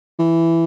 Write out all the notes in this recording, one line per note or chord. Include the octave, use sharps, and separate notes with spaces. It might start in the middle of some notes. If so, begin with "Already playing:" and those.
E3